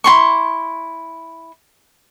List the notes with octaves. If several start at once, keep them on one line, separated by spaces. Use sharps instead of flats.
E4 F4 C6 C#6